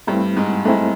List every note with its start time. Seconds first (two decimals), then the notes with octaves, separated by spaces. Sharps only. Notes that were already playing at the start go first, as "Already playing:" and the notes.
0.07 G2 G3 A3 C4 E4
0.36 G#2 G#3
0.65 G#2 G#3 A3 C4 E4